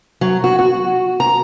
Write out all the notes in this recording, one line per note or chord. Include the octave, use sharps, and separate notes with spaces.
F#3
F#4
F#4
A#5